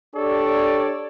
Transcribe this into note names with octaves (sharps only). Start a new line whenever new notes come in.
D4 G4 A4 C#5 D5